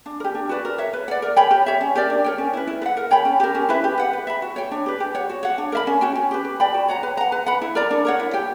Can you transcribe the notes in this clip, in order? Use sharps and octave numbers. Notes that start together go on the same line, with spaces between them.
D4
A#4
G4
D4
F#4 B4 D5
A#4
C#5 E5
B4
D5 F#5
A#4
C#5 G5 B5
G4
C#5 E5
C#4
G4 A#4 D5
D4
A#4 C#5 G5
C#4
E4 B4
E4
B4
F#5
A#4
C#5 G5 B5
C#4
G4 A#4
C#4
E4 B4 E5
G4
B4 F#5
B4
E5 B5
F#4
C#5 G5
D4
G4 B4
G4
C#5 F#5
F#4
C#5 F#5
D4
A#4 E5 B5
C#4
F#4 C#5 G5
C#4
G4 B4
B4
D5 G5 B5
F#4
C#5 F#5 A#5
B4
F#5 A#5
B4
F#5 B5
E4
A#4 D5 A#5
D4
A#4 C#5 F#5
E4
G4 C#5 G5